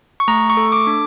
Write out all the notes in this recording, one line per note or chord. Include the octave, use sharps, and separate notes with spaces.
C#6
A3 A#5
C#6
A4
D6
D4